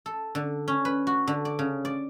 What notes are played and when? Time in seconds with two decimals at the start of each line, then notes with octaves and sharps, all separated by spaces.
0.06 A4
0.35 D3
0.68 C#4
0.85 B4
1.07 F#4
1.27 D3
1.45 D5
1.59 C#3
1.85 D5